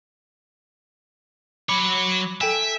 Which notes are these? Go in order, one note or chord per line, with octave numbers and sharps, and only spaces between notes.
F#3 C#5 B5 D6
A4 E5 G5 G#5